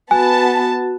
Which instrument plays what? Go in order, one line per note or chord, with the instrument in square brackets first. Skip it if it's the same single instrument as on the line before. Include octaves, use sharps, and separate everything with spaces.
[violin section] B3 A5 [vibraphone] F#4 [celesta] G#5